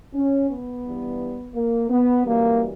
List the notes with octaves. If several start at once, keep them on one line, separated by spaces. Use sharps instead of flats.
C#4
B3
G2 E3 G3
A#3
B3
F#2 E3 G3 A#3